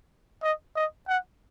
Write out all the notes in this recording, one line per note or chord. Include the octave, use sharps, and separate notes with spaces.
D#5
D#5
F#5